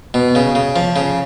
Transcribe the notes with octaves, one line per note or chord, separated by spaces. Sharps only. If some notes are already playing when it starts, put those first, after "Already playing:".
B2
C#3
C#3
F3
C#3